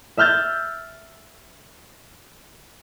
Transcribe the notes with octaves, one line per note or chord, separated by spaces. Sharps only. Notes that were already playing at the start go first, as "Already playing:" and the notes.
E5 E6 F6 G6 A6